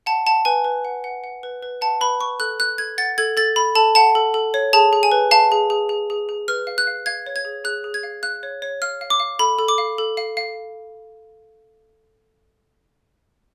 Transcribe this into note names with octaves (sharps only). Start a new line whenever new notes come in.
F#5 A5
F#5 A5
B4 G#5
B4
F#5
F#5
F#5
B4
B4
F#5 A5
B4 B5
B4 C#6
A4 F#6
A4 F#6
A4 G#6
F#5 A6
A4 G#6
A4 A6
A4 B5
A4 A5
F#5 A5
A4
A4
C#5
G#4 A5
G#4
G#5
B4
F5 A5
G#4
G#4
G#4
G#4
G#4
B4 F6
F5
F#6
F5
F5 G#6
C#5
G#6
G#4
G#4 F#6
G#4
G#6
F5
F5 F#6
C#5
C#5
F5 F6
F5
D6
F5
A4 B5
A4
D6
F5
A4
F5
F5